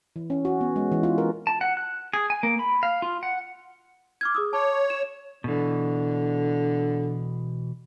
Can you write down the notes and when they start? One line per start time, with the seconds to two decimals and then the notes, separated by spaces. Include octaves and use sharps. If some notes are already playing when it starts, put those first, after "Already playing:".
0.16 E3
0.30 C#4
0.45 F#4
0.61 B3
0.76 G#3
0.92 E3
1.03 F4
1.18 A#4
1.47 A5
1.61 F#5
1.77 F#6
2.13 G#4
2.30 G#5
2.43 A#3
2.59 B5
2.83 F5
3.02 F4
3.23 F#5
4.21 D6 F6 G#6
4.35 G#4 D#6 E6
4.53 C#5 A5 D6
4.90 E7
5.44 B2 D3 E3